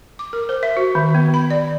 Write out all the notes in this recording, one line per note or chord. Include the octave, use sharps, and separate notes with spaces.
D6
A#4
C5
E5
F#4
D#3
B3
B5
D5